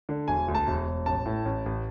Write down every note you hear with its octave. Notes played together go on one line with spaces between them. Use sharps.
D3
E1 G#5
D2
A5
E1
E1
A1 A5
A2
A1
A1